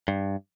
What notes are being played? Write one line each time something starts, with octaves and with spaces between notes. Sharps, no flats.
G2